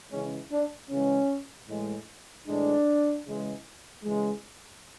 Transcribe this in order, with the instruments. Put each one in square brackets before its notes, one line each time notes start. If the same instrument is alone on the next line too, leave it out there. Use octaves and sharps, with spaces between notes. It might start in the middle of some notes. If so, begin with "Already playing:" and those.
[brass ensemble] C#3 E3 G#3 C#4
D4
C#3 E3 G#3 C#4
A2 E3 G#3
A2 E3 G#3 D4
C#3 E3 G#3
C#3 E3 G#3